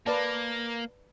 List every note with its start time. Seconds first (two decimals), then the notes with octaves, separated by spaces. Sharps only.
0.07 A#3 B4 D5 A5